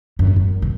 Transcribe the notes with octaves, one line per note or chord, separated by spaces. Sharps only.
F#2
F#2
B2